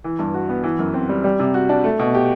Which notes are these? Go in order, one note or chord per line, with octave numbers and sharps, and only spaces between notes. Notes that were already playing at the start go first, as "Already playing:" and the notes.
E3
G2
F#4
B3
E3
F#2
C4
G3
G3
C3
F#4
D4
A3
B2
G4